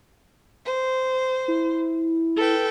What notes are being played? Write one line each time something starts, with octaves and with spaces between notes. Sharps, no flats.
C5
E4
A4 B4 G5